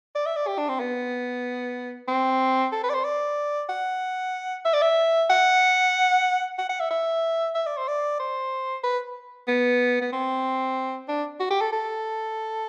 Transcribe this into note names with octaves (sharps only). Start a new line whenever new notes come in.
D5
E5
D5
G4
D4
C4
B3
C4
A4
B4
D5
C5
D5
F#5
E5
D5
E5
F#5
F#5
F#5
E5
E5
E5
D5
C5
D5
C5
B4
B3
B3
C4
D4
F#4
G4
A4
A4